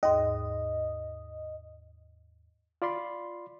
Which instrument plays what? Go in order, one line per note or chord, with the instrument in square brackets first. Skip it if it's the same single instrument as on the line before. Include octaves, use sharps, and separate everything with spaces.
[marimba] D#2 G#2 [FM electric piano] D#5
[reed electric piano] F4 D5 B5 C6